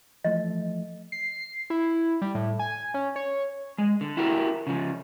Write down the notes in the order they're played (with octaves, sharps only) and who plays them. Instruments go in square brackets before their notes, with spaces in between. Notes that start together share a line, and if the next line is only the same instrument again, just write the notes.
[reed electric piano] E3 F3 A3 [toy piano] D#5
[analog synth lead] C7
E4
G3
A2
G#5
C#4
C#5
[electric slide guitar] G#3
D3
E4 F#4 G4 A#4
C#3 F3